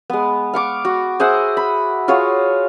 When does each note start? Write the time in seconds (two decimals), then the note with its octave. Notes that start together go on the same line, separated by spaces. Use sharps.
0.10 G#3 B3
0.54 F5 C#6 D6
0.85 F#4
1.20 G#4 C5 E5 F#5
1.57 B5
2.08 F4 F#4 G#4 C#5